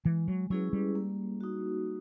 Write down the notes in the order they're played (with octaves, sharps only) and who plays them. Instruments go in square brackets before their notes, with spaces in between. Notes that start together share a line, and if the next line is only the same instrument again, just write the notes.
[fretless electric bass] E3 [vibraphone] G#3
[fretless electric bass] F#3
[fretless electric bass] F#3 [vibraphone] C#4 E4 G#4 B4
[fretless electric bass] G3
[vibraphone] A#3
D#4 F#4